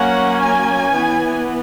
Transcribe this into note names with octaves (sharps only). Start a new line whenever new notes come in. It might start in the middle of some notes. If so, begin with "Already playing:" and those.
Already playing: F#3 A#3 C#4 F#5
G#5
E3 B3